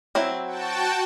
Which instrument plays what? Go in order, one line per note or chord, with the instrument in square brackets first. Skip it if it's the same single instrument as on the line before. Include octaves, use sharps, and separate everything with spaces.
[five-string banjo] F#3 C4 E4
[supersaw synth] F#4 G5 A5